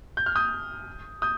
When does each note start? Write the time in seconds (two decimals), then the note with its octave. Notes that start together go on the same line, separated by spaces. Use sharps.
0.17 G6
0.26 F6
0.35 D#6 G6
1.22 D#6 G6